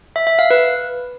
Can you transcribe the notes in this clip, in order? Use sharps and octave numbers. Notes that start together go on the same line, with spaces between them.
E5
E5
F5
B4